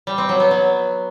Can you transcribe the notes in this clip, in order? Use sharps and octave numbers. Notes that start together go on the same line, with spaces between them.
G3
C4
F#3
B3
F#3